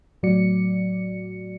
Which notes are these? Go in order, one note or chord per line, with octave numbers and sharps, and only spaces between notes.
A2 F#3 F#4 D5 C#7